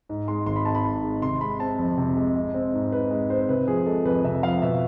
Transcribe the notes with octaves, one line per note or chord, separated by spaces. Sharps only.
G#2
G#3 C6
G#1 C6
B5
G#1 A5
B5
G#2
G#3
C3 C6
G#3 B5
C4 A5
F2
C3
G#3
G#3
C4
G#2
G#2 B4
G#3
C4 C5
C3 B4
F3 G#4
G#3 A4
F2 B4
C3 E5
F3 F5
B2 E5